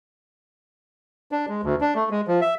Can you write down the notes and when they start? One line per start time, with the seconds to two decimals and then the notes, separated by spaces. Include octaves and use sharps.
1.32 D4
1.49 G#3
1.63 D2
1.81 D4
1.95 A3
2.11 G#3
2.28 F3
2.41 E5